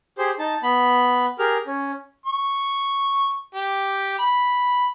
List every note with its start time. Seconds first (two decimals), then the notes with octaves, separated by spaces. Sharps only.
0.18 G4 G#4 C5
0.39 D#4 A5
0.63 B3 B5
1.39 G4 G#4 A#4 F6
1.67 C#4
2.26 C#6
3.55 G4
4.19 B5